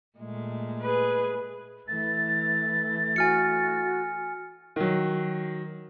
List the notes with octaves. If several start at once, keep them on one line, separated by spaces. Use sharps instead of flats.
A#2 G#3 A3
G#4 B4
E3 A3 A6
F#4 G#5 F6 C#7
D#3 F#3